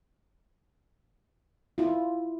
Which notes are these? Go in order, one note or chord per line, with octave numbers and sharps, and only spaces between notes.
E4 F4